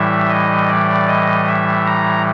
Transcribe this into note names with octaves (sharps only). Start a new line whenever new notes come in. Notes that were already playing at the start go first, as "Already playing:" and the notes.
Already playing: A2 E3 G3 E5
D#5
D5
D#5
E5
A#5